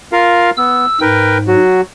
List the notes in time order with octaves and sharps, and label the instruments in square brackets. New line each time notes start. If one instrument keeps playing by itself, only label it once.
[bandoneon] F4 A#4 F5
[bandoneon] B3 [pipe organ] E6
[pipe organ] G#2 [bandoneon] A#4 B4 G5
[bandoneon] F#3 F#4